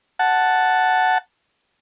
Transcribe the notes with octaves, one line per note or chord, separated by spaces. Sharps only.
F#5 A5